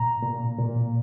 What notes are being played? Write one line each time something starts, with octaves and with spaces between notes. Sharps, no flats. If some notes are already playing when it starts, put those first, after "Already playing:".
Already playing: A#2 A#5
A#2
A#2